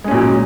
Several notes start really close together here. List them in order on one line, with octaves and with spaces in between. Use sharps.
G#3 C#4 A#2 F#3